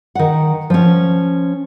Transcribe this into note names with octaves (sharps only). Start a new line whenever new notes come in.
D#3 F#5
F3 C#4